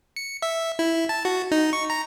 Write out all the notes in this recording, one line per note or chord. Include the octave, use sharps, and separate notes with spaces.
C#7
E5
E4
A5
F#4
D#4
C#6
A#5